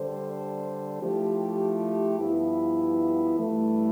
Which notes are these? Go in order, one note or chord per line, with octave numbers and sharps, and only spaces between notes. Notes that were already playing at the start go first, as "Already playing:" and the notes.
Already playing: D3 G3 D4 A4 C5
F3 A3 E4 G4
G2 F3 B3 E4
G2 E3 A3